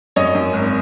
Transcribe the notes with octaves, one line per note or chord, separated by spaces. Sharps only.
F#2 C#5 D#5
F#2
G#1